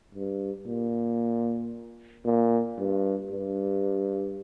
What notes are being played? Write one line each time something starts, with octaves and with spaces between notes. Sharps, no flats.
G2
A#2
A#2
G2
G2